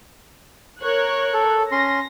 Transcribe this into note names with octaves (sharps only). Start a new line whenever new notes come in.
A#4 C#5 F#6
A4
C#4 C6 A#6